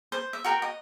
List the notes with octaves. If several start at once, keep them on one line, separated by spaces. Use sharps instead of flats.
C5
E5
F#4 A#4 G5
D#5